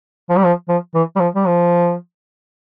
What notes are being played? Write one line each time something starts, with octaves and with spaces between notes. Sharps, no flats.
F3
G3
F3
F3
E3
G3
F3
G3
F3